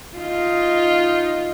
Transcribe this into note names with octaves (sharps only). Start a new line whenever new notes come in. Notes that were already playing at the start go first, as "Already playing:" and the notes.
D#4 F4